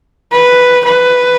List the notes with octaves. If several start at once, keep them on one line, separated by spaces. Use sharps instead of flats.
B4
B4